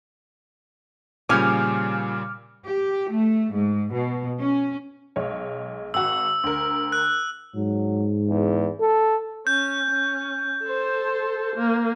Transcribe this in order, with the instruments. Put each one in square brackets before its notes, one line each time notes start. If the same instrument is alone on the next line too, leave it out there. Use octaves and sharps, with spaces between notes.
[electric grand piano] A#2 C#3 G3 [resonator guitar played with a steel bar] F3 C#4 G#5 [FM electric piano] D6 F6
[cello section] G4
A3
G#2
B2
C#4
[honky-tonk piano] B1 G#3 C#5
[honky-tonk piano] G#1 F#4 [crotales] E6
[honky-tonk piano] D2 A#4
[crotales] F#6
[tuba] G#2 [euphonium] F#3
[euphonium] E2
A4
[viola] C#4 [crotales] G6
[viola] C#4
A4 C5
A#3